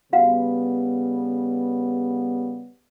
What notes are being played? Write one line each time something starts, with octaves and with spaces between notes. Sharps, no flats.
C#3 G3 B3 F#4 F5 F#5